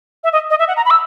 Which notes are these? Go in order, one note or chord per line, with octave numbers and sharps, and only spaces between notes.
E5
D#5
D#5
E5
F#5
A#5
B5
E6